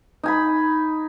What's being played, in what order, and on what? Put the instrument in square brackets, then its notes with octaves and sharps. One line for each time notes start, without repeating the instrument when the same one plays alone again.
[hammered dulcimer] D#4 G#5 B5